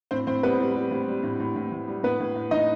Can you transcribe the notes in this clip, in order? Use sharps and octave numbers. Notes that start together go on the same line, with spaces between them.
A2 C4 C5
A2 C4 C5
G3 B3 B4
G3
G3
A2
G3
A2
A2
A2
A2
G3
A2 B3 B4
A2
A2
A2 D#4 D#5